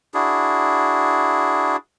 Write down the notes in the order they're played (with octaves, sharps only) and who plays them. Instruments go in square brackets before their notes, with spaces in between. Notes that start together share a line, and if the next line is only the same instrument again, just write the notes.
[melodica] D4 E4 F#4 G#4